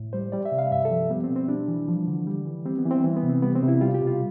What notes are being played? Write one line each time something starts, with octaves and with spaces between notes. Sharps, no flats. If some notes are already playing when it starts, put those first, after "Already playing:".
Already playing: A2
G3 C5
G3 D5
E5
C3
F5
G2 E5
A4
F3
G3 B3
C4
B2
C4
G3 D4
E3
F3
D3
G3
E3
G3 C4
B3
E3
C4
E3
B3
C3
C4
G3 B3
C4
C3
E4
G3 F4
G4
B2
F4